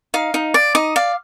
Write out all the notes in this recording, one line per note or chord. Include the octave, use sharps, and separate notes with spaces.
D#4 F5
D#4
D5
D#4 D#5
D5 F5